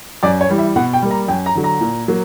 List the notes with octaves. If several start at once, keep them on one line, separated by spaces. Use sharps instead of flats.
F#2 D5
C#5
E3 G3
E5
B2 F#5
G5
G3 A#3
A#5
F#2 G5
A#5
D3 F#3
A#5
A#2
F#3 A#3